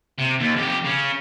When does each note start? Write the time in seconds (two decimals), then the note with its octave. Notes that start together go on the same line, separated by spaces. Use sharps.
0.19 C3
0.40 D#2
0.56 F2 G4
0.85 C#3 C#4